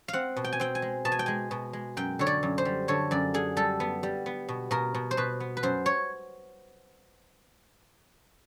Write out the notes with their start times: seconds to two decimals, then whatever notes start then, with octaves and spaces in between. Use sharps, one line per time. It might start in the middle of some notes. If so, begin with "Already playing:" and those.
0.08 F5
0.13 C4 F#5
0.36 B2
0.44 G5
0.53 G#5
0.60 C4 G5
0.75 G#5
0.82 G#3
1.05 B2 A5
1.12 G#5
1.19 G5
1.26 G#3 G#5
1.51 B2
1.73 G#3
1.97 F#2 G5
2.19 D3 C#5
2.27 D5
2.43 F#2
2.58 C5
2.65 G3
2.88 D3 C#5
3.11 F#2 D5
3.34 D3 G#4
3.57 G3 A4
3.80 B3
4.03 G3
4.26 B3
4.49 B2
4.71 B2 A#4
4.94 B2
5.11 C5
5.17 B2 B4
5.40 B3
5.57 B4
5.63 F#2 C5
5.86 C#5